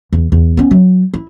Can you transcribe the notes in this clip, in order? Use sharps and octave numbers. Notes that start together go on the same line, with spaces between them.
E2
E2
B3 C#4
F#3
E4